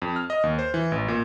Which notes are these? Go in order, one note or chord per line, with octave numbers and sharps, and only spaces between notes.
F2
F6
D#5
D#2
C5
E3
A1
A#2